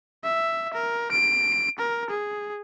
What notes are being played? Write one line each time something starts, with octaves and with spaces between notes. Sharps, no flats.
E5
A#4
D7
A#4
G#4